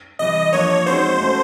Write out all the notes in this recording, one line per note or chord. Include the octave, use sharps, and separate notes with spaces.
C3 E3 G3 D#5
F3 A#3 D4 C#5
G#3 C4 D#4 F#4 C5
A3 C#4 F#4 B4